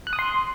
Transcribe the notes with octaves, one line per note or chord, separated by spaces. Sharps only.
F#6
D#6
C6